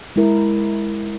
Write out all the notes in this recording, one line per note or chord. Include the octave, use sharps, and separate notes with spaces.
G#3 E4 A#4